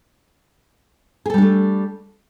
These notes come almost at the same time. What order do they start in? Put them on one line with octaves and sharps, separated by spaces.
G#4 A4 G3 D4 A3